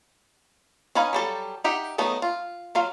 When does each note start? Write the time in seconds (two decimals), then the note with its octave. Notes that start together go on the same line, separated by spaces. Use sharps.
0.95 C#4 D#4 B4 F5 G#5
1.13 F#3 G3 A4
1.64 D#4 G4 E5 F#5
1.98 F#3 A3 B3 D#4
2.22 F4
2.75 F#3 F4 F5